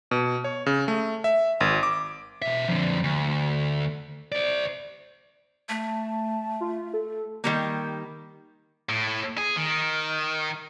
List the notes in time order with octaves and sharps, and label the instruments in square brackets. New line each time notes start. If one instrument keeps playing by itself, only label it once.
[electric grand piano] B2
C#5
C#3
A3
E5
G#1
D6
[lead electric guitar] B2 E5
F2 D3
D2
C5 D5
[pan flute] A3 [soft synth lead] A5
[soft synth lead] F4
A4
[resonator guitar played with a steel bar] D#3 G3 A#3
[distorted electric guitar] A2
G#4
D#3